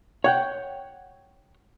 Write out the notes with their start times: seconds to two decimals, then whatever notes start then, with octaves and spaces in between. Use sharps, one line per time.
0.24 C#5 F#5 G5